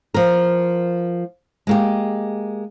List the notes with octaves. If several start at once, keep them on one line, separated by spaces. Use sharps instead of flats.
F3 A#4
G#3 A#3 G4